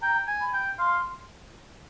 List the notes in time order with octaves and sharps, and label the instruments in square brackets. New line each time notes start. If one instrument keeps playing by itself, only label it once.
[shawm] G5 [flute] A#5
[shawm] G#5
[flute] B5
[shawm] G5
[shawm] F5 [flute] C6